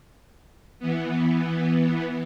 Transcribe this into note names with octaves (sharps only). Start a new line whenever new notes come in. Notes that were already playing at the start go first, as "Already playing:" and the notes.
E3 B3